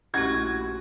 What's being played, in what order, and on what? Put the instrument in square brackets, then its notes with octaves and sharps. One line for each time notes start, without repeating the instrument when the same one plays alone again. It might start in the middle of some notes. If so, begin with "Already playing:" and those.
[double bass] A#1 A3 [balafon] C#4 E4 G4 [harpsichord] F#4 [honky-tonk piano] G#6